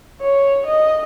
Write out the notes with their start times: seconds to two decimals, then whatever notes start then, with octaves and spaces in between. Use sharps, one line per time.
0.21 C#5
0.66 D#5